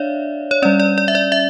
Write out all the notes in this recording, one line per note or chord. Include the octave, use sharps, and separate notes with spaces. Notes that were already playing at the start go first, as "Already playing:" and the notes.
Already playing: D4 C#5 D5 E5 F5
C#5
G3 C#4 D5
D5
D5
E5
D5
E5